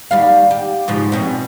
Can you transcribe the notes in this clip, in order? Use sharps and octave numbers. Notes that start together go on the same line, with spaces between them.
D#2 G3 F5
G4
G#2 C#3 F3
B2 C4 C#4